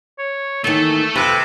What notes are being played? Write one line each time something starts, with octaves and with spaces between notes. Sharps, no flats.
C#5
D#3 E3 A3 A#3 A4
F2 C3 B4 A5